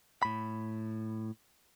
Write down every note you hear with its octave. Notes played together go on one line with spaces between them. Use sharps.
A2 B5